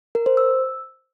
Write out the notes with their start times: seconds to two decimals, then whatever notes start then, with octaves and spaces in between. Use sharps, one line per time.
0.15 A#4
0.26 C5
0.37 E6